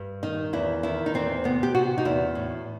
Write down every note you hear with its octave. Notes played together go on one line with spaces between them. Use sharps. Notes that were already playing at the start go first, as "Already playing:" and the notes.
Already playing: G2
D#3 D#4
E2 E4
D#3 E4
D#4
E2 C4
C3 B3
G4
C3 F#4
D#4
E2 E4
A2